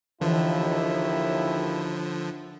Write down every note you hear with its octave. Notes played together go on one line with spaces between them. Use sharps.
D#2 D3 E3 F3 E4